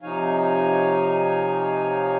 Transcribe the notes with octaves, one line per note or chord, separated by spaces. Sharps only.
C3 F3 D#4 C#5 F5 G#5